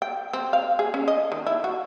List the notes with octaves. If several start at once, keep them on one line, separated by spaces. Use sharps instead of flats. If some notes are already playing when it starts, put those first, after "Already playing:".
G5
C4
F5
G#4
C#4
D#5
D#3
E4
F#4